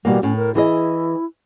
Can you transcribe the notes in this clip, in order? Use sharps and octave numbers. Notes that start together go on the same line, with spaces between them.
B2 E3 G3 A#3
A2 C#4
A#4
E3 E4 G#4 D#5